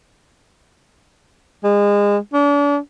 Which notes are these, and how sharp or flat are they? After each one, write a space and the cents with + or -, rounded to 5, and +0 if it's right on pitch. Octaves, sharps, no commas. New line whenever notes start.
G#3 -30
D4 -40